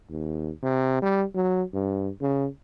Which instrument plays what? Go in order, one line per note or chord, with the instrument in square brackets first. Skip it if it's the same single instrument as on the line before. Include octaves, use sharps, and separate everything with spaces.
[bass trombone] D#2
C3
G3
F#3
G2
C#3